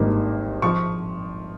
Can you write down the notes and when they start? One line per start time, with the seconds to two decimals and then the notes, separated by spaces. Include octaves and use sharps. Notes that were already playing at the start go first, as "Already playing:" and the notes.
Already playing: G#1 G2 D#3 G3 A#3
0.62 F3 C#6